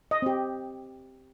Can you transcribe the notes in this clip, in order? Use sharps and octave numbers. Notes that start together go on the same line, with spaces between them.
D#5
C4 G4